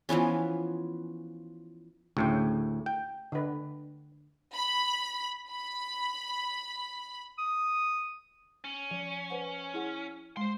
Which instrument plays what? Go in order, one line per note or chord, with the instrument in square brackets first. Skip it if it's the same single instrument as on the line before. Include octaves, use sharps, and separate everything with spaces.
[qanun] E3 F3 B3 C#4
[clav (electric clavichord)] D2 A2 G5 [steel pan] C#3
[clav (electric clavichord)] G5
[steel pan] D3 B4
[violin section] B5
B5
[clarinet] D#6
[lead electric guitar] C#4
[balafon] F3
B4 C5 F#5
E4 G#4 F#5
[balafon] G#3 [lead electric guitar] C5 C6